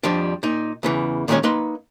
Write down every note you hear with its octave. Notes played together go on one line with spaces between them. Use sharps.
F2 F3 G3 D4
A#2 D#4
E2 C#3 E3
A#2 D#3 G3 G#3 C#4 C#5
A#3 D#4 B4 C6